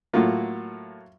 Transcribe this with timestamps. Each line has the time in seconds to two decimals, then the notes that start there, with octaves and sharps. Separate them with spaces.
0.13 A2 F#3 A#3 F4